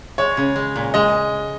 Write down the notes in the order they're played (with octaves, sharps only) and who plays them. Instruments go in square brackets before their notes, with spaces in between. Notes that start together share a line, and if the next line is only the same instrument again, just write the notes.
[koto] G#3 [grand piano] C#5
[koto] C#3
G#3
A#2
[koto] G#3 [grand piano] D#5